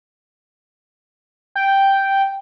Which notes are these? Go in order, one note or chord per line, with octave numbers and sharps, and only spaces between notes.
G5